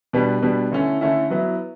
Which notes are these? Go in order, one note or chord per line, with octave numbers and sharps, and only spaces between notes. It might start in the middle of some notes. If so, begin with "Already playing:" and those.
B2 G3 B3 D4
B2 G3 B3 D4
D3 A3 C#4 E4
D3 A3 C#4 E4
F#3 B3 E4